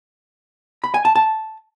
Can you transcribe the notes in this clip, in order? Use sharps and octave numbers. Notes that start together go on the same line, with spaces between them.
B5
G#5
A5
A5